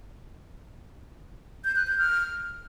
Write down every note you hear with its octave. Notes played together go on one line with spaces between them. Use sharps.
G6
F#6
G6
F6